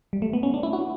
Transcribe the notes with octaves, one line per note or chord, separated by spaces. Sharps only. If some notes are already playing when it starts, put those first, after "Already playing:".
G3
A3
B3
C#4
D4
E4
F#4